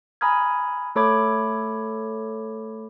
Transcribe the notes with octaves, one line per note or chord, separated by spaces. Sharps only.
G#5 A#5 B5 D#6 F6 G#6
A3 A4 C#5 B5 D6 G#6